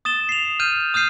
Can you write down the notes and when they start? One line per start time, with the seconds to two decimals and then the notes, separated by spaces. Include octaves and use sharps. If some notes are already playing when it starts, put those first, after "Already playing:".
0.05 D#6 A6 E7 G7
0.29 C7 F7
0.60 F6 G6 D#7
0.94 D#6 F6 G6 C7 D#7